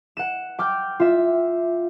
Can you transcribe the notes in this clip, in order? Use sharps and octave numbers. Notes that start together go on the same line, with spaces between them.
F#5 E7
G5 D6 F6 G6
F4 E5